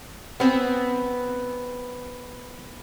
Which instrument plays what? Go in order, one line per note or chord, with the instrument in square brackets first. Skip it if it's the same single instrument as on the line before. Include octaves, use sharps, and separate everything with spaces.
[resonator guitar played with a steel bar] B3 C4